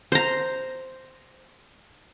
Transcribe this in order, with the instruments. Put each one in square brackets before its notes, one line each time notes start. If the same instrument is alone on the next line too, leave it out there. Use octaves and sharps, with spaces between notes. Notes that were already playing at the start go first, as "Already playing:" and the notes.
[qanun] C5 A#5